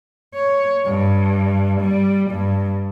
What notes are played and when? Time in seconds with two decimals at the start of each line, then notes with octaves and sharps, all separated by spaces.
0.35 C#5
0.86 G2
1.81 G3
2.30 G2